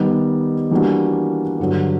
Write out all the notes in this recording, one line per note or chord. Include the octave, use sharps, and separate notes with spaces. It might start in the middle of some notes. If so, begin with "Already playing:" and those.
Already playing: D#3 G3 B3 D#4 G4
E3 G3 A#3 D4 F#4
G2 D3 F#3